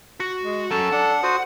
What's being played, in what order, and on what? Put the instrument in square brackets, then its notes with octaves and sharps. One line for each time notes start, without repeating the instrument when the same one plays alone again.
[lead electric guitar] F#4
[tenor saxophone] G#3
[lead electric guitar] F#3 C#4 [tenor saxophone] A4
[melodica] D4 [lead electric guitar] F#5
[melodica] F#4 C5 D#6